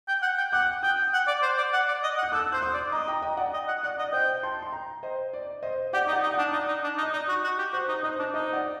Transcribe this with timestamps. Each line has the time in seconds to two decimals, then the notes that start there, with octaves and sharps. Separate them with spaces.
0.08 G5
0.22 F#5
0.37 G5
0.52 F#5 D6 F#6
0.83 G5 D#6 G6
1.13 F#5
1.27 D5
1.42 C5
1.57 D5
1.73 F#5
1.88 D5
2.03 D#5
2.17 F#5
2.23 G6
2.32 A4 D6 F#6
2.52 C5 F#6
2.62 C6 D#6
2.73 D5
2.92 D#5 A#5 D6
3.08 G5 A#5
3.22 D#5 G5
3.37 D5 F#5
3.53 D#5
3.68 F#5
3.83 D5 F#5
3.99 D#5
4.04 D5
4.13 C5 D#5 G5
4.43 A5 C6
4.62 C6
4.72 G5 A#5
5.03 C5 D#5
5.33 D5
5.63 C5 D#5
5.93 G4 D5 F#5
6.08 D#4
6.13 D5 F#5
6.23 D#4
6.33 D5 F#5
6.38 D4
6.53 D#4 D5
6.68 D#4
6.83 D4
6.98 D#4
7.03 D#5
7.13 D#4 D5
7.29 F#4
7.44 F#4
7.58 G4
7.73 F#4 C5
7.88 D#4
8.03 D#4 C5 D#5
8.19 D4
8.34 D#4 C5 D#5
8.53 D5 F#5